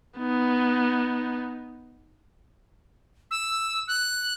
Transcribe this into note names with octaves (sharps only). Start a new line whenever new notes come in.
B3 D#4
E6
F#6